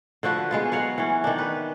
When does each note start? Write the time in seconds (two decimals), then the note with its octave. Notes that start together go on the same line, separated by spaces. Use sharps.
0.23 D3 F3 F#4 B4
0.51 G#3 B3 F4
0.72 F#3 C#5 F5 F#5
0.98 E3 C#4
1.24 D#3 D4
1.38 B4